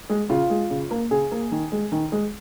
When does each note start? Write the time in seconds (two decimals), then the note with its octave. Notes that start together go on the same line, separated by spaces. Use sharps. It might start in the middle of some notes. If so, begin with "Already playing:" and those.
0.10 G#3
0.29 C#3 F4
0.50 G#3
0.70 C#3
0.91 A#3
1.11 C#3 G#4
1.32 A#3
1.52 D#3
1.72 G#3
1.92 D#3
2.12 G#3